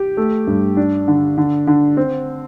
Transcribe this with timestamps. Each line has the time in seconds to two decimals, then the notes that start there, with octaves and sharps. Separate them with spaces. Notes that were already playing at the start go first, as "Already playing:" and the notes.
Already playing: G4
0.17 A3
0.47 G2
0.77 D4
1.08 D3
1.38 D3
1.67 D3
1.97 C4